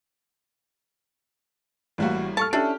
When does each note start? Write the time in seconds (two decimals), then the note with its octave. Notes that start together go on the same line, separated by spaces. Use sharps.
1.98 A1 A2 G3 A#3 F#4
2.37 A4 A5 C#6 F6
2.53 C#4 D4 E4 G4 A4